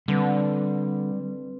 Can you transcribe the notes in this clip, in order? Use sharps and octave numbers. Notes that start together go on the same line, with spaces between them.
D3 G3 C4 B4